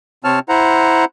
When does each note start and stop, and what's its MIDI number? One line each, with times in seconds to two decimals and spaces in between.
0.24 0.39 48
0.24 0.39 60
0.24 0.39 73
0.24 0.39 81
0.24 0.39 89
0.49 1.05 64
0.49 1.05 72
0.49 1.05 78
0.49 1.05 82